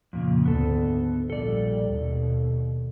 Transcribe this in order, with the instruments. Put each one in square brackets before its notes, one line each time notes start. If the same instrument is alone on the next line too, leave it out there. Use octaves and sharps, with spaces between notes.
[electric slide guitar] F2 A#2 C#3
[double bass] D2 G#2 [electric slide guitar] B3 A4
[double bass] A#1 G3 [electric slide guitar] A4 D5
[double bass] D#2 B2